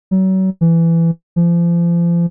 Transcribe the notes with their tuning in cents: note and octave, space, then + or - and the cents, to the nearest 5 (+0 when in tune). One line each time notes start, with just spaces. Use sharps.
F#3 +35
E3 +15
F3 -35